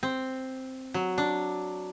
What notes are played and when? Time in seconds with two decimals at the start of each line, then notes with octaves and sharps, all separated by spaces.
0.03 C4
0.94 F#3
1.18 D4